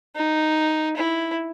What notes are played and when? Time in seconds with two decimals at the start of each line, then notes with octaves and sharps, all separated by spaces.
0.16 D#4
0.97 E4